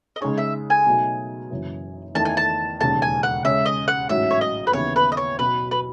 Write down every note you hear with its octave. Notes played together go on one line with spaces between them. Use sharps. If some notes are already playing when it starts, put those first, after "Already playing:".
D#5
C#3 G#3 D#4 G#4 C#5
E5
G#5
B2 F#3 A3 D#4
F#1 F#2 E3
E2 D#3 A3 E4 A5
G#5
A5
E1 D#2 C#3 A5
G#5
F#5
C#3 G#3 C#4 E5
D#5
F#5
A1 G#2 F#3 C#4 F#4 E5
C#5
D#5
B4
D#2 C#3 E3 B3 E4 C#5
B4
D#5
C#5
B2 F#3 B3 F#4 B4
B4